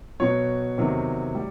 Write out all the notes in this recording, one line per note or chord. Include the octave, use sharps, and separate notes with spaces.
B2 F#3 C#5
E2 C3 D#3 F#3
G3